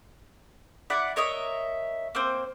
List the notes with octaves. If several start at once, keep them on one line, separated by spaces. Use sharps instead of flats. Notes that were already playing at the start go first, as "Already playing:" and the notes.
E4 D5 F#5
A#4 C#5 D#5 E5
A#3 C4 C5